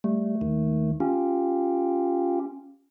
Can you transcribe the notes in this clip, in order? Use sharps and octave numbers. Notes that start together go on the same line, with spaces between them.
G3 A3
D#2 D#3
C#4 F4 G4